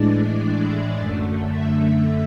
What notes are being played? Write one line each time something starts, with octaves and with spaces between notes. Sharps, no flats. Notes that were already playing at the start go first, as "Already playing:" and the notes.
Already playing: A2 E3 G#3 D4 D5
F#2 D3 A3
E5